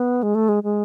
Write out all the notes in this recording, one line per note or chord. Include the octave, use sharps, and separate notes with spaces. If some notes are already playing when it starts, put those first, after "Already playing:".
Already playing: B3
G#3
A3
G#3
G#3